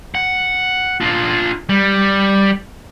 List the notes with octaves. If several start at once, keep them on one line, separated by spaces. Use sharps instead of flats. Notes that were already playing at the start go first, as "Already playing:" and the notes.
F#5
D4 F4
G3